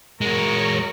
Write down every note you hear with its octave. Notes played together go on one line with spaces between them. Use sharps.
G#3 F#4 A#4 C#5